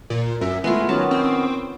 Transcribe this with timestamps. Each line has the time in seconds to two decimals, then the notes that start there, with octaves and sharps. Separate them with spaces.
0.10 A#2
0.41 F#2 E5
0.64 G#3 A3 B3 E4 F4
0.89 D#3 F#3 B3 C#4 A5
1.11 C4